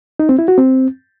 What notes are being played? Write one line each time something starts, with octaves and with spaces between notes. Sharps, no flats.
D#4
C4
E4
F#4
C4